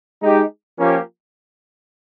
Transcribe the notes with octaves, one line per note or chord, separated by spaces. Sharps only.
G#3 D#4 G4
F3 A#3 C#4 G4